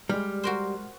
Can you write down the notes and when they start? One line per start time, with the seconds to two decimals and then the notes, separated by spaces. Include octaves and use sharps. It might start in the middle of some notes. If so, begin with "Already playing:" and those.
0.09 G3 G#3 F6
0.43 F#4 A#4 C5